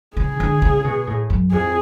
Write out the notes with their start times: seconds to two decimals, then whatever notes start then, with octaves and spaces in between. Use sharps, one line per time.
0.17 C#3 G#4
0.40 D3
0.62 C#3
0.84 B2
1.07 A2
1.30 F#2
1.52 F2 G#4